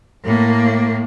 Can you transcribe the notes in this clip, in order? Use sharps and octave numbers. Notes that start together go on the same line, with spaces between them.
A2 A#3